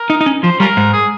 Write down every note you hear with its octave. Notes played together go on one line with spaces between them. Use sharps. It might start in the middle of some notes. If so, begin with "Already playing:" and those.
Already playing: A#4
D#4
D#4
C#4
F3 C5
G3 C#4 F4 A#4
G#2
G#4